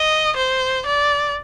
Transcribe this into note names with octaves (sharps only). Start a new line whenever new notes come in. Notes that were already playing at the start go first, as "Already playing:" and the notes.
Already playing: D#5
C5
D5